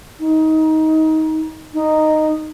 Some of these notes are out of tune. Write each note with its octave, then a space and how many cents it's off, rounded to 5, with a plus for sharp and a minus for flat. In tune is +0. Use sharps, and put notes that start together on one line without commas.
D#4 +20
D#4 -10